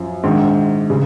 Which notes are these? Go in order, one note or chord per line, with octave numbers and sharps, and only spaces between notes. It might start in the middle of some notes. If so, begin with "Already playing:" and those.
Already playing: F#2 F3
A#1 G#2 D#3
C#3